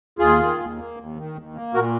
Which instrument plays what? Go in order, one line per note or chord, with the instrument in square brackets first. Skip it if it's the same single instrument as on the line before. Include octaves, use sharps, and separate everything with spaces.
[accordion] D#2 F4 G#4
D#3
D#2
A#3
D#2
D#3
D#2
A#3
A#2 F#4 A#4